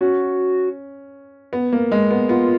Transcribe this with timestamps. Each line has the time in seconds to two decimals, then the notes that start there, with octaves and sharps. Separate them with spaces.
0.01 C#4 F#4
1.53 B3
1.73 A#3
1.92 G#3
2.11 B3
2.29 B3 F4